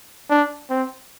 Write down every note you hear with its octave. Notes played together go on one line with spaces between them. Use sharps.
D4
C4